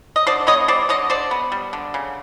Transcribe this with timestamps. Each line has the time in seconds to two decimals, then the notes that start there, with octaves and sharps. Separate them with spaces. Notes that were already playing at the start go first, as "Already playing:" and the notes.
0.16 D#5
0.27 D3 C5 D5
0.47 B3 C#5 D#5
0.68 G3 C5 D5
0.89 D3 C#5 D#5
1.10 D3 C5 D5
1.31 B3
1.52 G3
1.73 D3
1.94 C#3